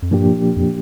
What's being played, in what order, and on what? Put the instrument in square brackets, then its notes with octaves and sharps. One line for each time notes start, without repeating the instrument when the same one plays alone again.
[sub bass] F2
[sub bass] G2 [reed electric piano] A#2 F3 A#3 D4 G4
[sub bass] F2